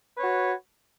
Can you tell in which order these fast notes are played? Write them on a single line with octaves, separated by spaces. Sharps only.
B4 C#5 F#4